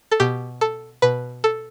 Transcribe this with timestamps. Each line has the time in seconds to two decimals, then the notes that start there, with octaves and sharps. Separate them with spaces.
0.11 A4
0.20 B2 G4
0.61 A4
1.02 B2 B4
1.44 A4